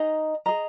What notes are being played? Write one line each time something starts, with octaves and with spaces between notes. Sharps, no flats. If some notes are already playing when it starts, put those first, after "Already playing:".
Already playing: D#4 G#4 D#5 A#5
G#4 D#5 A#5